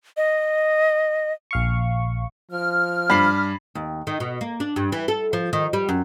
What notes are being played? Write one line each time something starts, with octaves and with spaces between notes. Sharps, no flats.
D#5
A#1 F5 C#6
F3 F6
G2 D4 B5 C7
D#2
D#3
B2
A#3
D4
G2
E3
A4
F3
D#3
G3
F#2